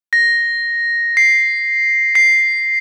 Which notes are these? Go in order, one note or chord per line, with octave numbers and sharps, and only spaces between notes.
A#6
C7
C7